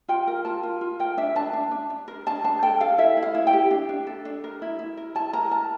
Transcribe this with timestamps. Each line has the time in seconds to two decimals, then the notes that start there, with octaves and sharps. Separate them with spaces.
0.08 F4 G5
0.27 A#4
0.45 F4 A5
0.63 F4
0.81 F4
0.99 A#4 G5
1.17 D4 E5
1.36 D4 A5
1.53 D4
1.71 D4
1.90 D4
2.08 A#4
2.26 D4 A5
2.44 D4 A5
2.62 A4 G5
2.81 A4 F5
2.98 E4 E5
3.17 E4
3.23 F5
3.35 E4
3.47 G5
3.53 G4
3.71 D4
3.89 D4
4.07 A4
4.25 D4
4.44 A#4
4.62 E4
4.79 E4
4.97 A#4
5.15 E4 A5
5.33 A#4 A#5
5.51 A#4 A5